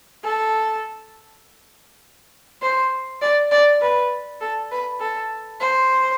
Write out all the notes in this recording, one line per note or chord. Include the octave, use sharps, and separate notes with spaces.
A4
C5
D5
D5
B4
A4
B4
A4
C5